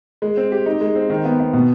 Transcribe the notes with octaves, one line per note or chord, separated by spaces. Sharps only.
G#3
C4
G4
D#4
G#3
C4
D#3
B3
B3
B2